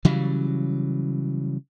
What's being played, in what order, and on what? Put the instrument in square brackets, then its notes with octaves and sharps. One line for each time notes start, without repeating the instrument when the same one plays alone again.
[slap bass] C#3 E3 F#3 G3